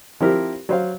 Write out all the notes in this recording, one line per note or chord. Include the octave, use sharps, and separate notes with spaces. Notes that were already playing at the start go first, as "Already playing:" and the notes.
F3 C4 E4 G4 A#4
F#3 C5 F5